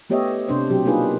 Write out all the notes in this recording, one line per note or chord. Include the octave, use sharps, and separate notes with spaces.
A3 B3 G4 C#5 D#5 E5
C3 D4 C5
B2 F#3 G4
A#3 D4 D#4 F4 G#4 B4